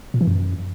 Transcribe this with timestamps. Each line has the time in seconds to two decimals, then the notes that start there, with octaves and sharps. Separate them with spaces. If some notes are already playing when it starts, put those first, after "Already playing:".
0.14 A#2
0.21 E3
0.27 F#2